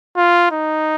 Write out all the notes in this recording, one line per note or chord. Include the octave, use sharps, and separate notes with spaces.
F4
D#4